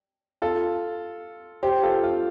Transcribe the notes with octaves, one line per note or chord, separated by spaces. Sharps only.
F4 A4
G4 C5
F4 A4
F4